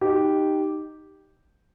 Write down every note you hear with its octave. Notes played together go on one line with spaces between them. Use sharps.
D#4 G4